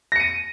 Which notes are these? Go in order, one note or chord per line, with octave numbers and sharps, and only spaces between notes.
A#6 C#7 D#7